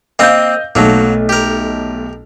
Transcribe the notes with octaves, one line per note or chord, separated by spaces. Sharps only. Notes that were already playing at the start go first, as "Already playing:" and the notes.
A#3 C4 D#5 F5 C6 G6
B1 F#3 A3 A#3
G4 A#4